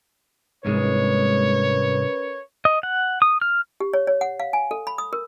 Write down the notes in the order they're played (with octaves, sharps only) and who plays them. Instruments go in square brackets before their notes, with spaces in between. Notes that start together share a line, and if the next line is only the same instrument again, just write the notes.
[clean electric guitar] C2 G#2 G#3 [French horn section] C#4 A#4 B4 [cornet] C#5
[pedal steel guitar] D#5
F#5
D#6
F6
[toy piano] G4
C#5
C#5
F#5
F5
G#5
A4
B5
D#6
A#4